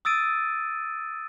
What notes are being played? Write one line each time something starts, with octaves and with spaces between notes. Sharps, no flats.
D#6 E6 A6 D7 D#7